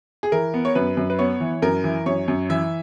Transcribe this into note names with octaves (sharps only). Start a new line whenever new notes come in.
G#4
E3 A#4
B3
C#5
F#2 B4
F#2
B4
B3 C#5
E3
F#2 A#4
E3
F#2 C#5
F#2
E3 E5